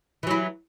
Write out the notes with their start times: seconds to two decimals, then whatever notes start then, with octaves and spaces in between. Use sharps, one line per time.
0.23 E3
0.27 F#3
0.31 E4